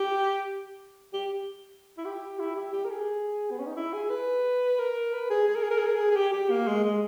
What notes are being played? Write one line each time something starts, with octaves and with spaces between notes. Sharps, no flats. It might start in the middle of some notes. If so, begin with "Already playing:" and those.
Already playing: G4
G4
E4
G4
E4
G4
G4
A#4
G#4
B3
C#4
D#4
E4
G#4
B4
A#4
B4
G#4
G#4
A#4
G#4
A#4
G#4
A#4
G#4
G#4
G4
G4
A#3
G#3
G#3